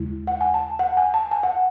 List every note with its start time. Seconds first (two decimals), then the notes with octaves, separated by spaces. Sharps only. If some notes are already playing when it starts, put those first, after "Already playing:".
Already playing: D#2 C#3 G#3 E4
0.27 F#5
0.41 G#5
0.54 A5
0.79 F#5
0.97 G#5
1.14 A5
1.31 G#5
1.43 F#5